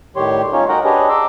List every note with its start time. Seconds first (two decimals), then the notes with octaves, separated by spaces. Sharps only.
0.16 A2 D#3 G3 G4 C#5 C6
0.53 C#4 D#4 F4 C#5
0.69 F#4 A#4 D#5 F#5 G5 A#5
0.84 D4 G4 G#4 B4 C#5 D#5
1.09 A#5 C6 D6 E6